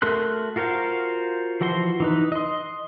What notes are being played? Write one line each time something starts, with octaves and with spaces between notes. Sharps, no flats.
A3 F#4 A#4 C6 F#6
F4 F#4 A#4 C5 F5
E3 F3 F#4 C5 C6
E3 D#4 B4
D#5 C6